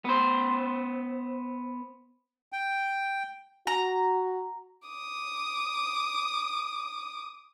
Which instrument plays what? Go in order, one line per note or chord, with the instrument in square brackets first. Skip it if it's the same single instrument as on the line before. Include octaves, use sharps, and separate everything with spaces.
[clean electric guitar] B3 C5
[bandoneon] G5
[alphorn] F#4 [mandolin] A#5
[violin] D6 D#6